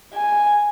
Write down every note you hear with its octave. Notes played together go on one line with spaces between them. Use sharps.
G#5